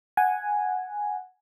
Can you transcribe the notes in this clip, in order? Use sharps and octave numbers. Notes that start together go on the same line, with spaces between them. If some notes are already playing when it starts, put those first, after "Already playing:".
F#5 G#5